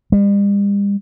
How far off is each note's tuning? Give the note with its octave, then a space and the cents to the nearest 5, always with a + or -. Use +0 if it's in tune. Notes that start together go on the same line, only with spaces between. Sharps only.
G3 +45